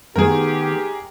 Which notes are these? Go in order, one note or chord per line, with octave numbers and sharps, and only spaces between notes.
D#3 G#3 A3 B3 G4 G#4 A#4